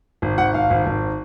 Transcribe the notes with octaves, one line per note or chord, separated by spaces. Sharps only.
G#1
G#1 F#5
G#1 F5
G#1
G#1